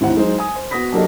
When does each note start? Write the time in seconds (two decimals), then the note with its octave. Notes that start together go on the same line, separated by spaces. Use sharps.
0.01 A1 D#2 E3 C4 C5 F#5
0.16 F#3 G#3 D#4 C5
0.39 G#5 D#6
0.56 C5
0.71 B3 F#4 D#6 A#6 B6
0.92 F#3 A#3 D4 G4 A4 D#5